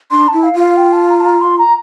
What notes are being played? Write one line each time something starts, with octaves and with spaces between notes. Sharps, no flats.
D4 C6
A5
E4
F5
F4
F5
G5
A5
A#5
A5
A#5
C6
A#5